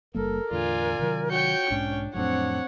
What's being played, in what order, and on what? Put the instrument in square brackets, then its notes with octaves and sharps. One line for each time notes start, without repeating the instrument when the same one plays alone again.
[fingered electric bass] F#1 G3 A#3 [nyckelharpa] A4 [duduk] A#4
[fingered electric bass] E2 A2 D3 [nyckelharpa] F4 [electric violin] D5 G#5
[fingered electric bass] C3 D#3 F#3
[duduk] F#4 [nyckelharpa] C#5 G5 [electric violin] G6 C#7
[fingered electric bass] B1 G#2 [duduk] C#4 [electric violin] D4
[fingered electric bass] F2 A2 F#3 [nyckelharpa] C4 [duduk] D4 [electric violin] C#5 F#5